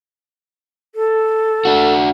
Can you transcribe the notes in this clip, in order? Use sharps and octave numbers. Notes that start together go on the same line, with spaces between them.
A4
D4 F#4